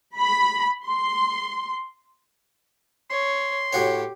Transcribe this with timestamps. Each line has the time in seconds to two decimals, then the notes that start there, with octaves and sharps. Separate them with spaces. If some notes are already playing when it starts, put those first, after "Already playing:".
0.19 B5
0.87 C6
3.11 C#5 C6
3.73 A2 F#4 G4 C#5